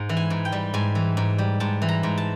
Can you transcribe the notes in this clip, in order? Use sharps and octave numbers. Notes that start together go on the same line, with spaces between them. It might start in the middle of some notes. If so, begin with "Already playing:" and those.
Already playing: G#2
E3
G#5
G#2
G5
G3
G#2 G#5
E3
G#2
G3
G#2 A5
E3
A#5
G#2
A5